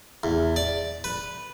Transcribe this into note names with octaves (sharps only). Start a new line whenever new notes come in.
E2
D5
B4